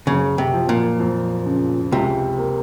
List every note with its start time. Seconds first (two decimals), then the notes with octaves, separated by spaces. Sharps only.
0.07 F#1 C#3
0.38 C3
0.54 F3
0.69 A#2
1.00 F2
1.46 C#3
1.92 C#2 C3
2.38 A#3